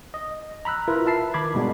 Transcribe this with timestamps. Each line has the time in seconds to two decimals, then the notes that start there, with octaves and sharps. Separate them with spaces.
0.14 D#5
0.65 A#5 B5 E6 F#6
0.88 E4 F4 A#4 B4
1.06 E5 A5 C7
1.34 D#3 B5 D6 G#6
1.54 G2 B2 G#3 B3 D4